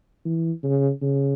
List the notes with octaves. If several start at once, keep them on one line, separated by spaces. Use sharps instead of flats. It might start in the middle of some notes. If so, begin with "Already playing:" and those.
E3
C#3
C#3